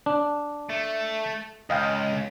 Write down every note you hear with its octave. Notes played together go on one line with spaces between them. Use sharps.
D4
A3
C#2 D#5 F5 G5